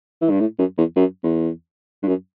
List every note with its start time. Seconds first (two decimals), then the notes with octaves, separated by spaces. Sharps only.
0.21 E3
0.30 G2
0.40 A2
0.59 F#2
0.78 E2
0.96 F#2
1.24 E2
2.03 G2
2.08 F#2